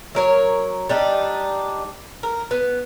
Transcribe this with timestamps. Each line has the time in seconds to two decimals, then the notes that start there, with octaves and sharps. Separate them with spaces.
0.15 F#3 A#4 C#5
0.89 G3 D4 D#4
2.23 A#4
2.51 B3